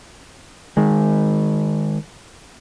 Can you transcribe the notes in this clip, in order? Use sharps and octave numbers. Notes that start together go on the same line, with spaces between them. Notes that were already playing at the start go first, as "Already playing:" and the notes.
D#3 G#3